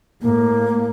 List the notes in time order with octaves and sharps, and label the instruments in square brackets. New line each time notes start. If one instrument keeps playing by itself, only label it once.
[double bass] A2 [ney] A#3